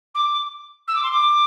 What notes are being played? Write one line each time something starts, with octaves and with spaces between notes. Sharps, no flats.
D6
E6
D6
C6
D6